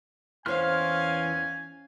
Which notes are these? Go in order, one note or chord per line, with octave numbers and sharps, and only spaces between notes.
E2 E3 C#4 C5 F5 G#5 C6 F6